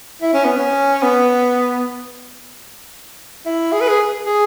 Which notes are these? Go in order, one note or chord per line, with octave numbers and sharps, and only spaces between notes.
E4
C#4
B3
C#4
B3
E4
G#4
B4
G#4
G#4